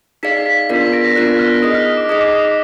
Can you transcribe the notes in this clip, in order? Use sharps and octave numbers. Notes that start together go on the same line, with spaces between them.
D#4 G#4 D5 F5 B6
B6
B3 D4 F4 A#4 D5 B6
A#6 D7
B3 D4 F4 A#4 D5 F#6
F6
D#4 G#4 D#5 D#6
F6
D#6
D6
D#4 G#4 D#5 D#6
D6
D#6
D6